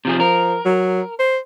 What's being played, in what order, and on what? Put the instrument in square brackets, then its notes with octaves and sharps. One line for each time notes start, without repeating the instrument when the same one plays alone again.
[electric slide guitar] C3 F3 G#4
[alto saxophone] F3 [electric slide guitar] A#4
[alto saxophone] F#3
C5